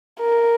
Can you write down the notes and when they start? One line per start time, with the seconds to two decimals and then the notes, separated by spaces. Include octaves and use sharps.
0.20 A#4